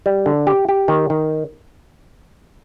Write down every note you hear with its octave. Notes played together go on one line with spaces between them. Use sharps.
G3
D3
G4
G4
D#3
D#3